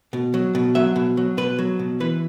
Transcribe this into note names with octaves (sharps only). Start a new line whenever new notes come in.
B2
F#3
B2
F#3 E5
B2
F#3
B2 B4
F#3
B2
E3 B4